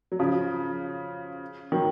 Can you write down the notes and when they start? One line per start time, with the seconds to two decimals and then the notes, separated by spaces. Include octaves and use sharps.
0.12 F#3
0.19 C#3 F3
1.72 D#3 F#3